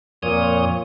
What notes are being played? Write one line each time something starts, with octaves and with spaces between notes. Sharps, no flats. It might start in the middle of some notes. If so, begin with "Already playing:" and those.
F2 A#2 C#5 D#6